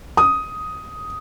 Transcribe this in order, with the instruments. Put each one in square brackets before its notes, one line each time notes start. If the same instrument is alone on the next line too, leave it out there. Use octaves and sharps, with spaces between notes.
[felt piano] D#6